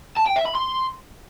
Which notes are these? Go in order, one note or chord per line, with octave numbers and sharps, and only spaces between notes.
A5
G5
E5
B5
C6